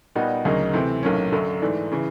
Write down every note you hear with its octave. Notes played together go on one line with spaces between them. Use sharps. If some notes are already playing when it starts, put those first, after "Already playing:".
A#2 G3 B3 D#4 F#4
D2 C#3 F#3 A#3 D#4
C3 E3 A3 C4
B1 A2 F#3 A#3 C#4
F#2 D3 F#3
G#2 E3 A3 D4
C#3 E3